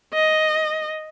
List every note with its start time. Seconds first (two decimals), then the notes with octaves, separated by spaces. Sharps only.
0.14 D#5